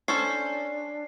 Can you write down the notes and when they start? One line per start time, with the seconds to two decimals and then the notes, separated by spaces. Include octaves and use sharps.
0.08 C#4 D4 A4 C5 C7